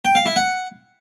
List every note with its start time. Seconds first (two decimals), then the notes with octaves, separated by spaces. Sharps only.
0.05 G5
0.15 F5
0.26 E4
0.36 F#5